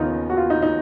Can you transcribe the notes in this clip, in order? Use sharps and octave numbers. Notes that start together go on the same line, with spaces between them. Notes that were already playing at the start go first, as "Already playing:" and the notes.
Already playing: D#2 C#3 B3 D#4 F4
F#4
F4
D#4
D#4